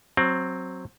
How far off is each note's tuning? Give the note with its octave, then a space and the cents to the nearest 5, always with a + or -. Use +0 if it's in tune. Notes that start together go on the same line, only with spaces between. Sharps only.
F#3 +0 C4 +10